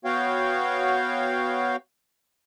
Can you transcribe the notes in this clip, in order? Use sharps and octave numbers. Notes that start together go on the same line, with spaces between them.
B3 F#4 C#5 F5 G5